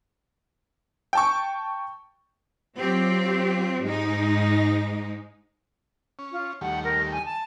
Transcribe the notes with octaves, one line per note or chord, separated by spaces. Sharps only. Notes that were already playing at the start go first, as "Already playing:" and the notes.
G5 A5 C#6
F#3 C4 F4 G4
G#2 G#3 D#4
C#4
F4
D#2 G3 A3 F#5
A#4
G#5
A5